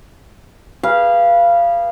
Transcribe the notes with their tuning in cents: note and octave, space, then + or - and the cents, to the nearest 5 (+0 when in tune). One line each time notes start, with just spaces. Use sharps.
G#4 -30 B4 -25 F5 -20